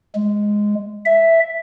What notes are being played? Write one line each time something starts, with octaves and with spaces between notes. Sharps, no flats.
G#3
E5